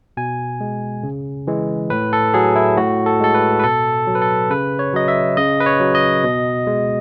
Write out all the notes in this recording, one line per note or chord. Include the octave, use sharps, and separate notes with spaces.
B2 G#5
G#3
C#3
E3 G#3
A2 B4
A4
F#3 G#4
E4
A2 F#4
A4
G#3 A4
B4
B4
B2 A4
F#3
B4
A4
C#3 B4
C#5
F#3 D#5
E5
C#3 D#5
B4
C#5
F#3
D#5
B2
G#3